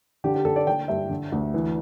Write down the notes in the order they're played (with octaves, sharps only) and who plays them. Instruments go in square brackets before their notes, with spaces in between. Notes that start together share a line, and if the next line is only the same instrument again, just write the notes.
[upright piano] D3 G4
G4
D3 A4
D5
D3 G5
G2 E5
D3
D2
E3